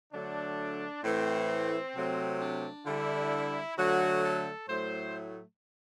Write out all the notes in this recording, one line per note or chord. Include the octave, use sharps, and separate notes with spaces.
D3 F#3 A3 D4
A2 E3 A3 C4
C3 F#3 A3
D4
D3 G3 E4
D3 F#3 A3 F#4
A4
A2 F#3 A3 C5